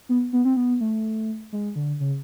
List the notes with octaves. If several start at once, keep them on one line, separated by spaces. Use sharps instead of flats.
B3
B3
C4
B3
A3
G#3
D3
C#3